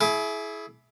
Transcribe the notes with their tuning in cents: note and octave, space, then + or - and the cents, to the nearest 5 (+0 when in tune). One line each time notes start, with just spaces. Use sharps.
E4 +0 G#4 +35 D6 +0